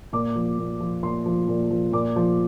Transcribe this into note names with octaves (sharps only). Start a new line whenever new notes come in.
A#2 D6
F3
A#2
F3
A#2 C6
F3
A#2
F3
A#2 D6
F3